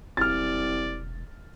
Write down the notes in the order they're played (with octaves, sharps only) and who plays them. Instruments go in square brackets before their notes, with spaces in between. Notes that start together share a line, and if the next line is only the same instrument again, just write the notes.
[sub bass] E1 [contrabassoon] C2 [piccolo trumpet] D5 [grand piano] F6 A6